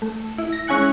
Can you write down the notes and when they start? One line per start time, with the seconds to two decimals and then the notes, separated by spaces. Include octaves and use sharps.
0.02 A3
0.38 E4
0.52 A#6
0.67 G#3 C#4 E4 G#5 F#6 C#7